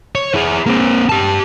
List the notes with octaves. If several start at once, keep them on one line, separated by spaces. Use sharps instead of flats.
C#5
E4 G#4
A#3 C4
G4 A5